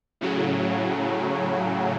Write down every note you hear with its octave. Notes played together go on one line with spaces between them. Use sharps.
A2 C#3 F#3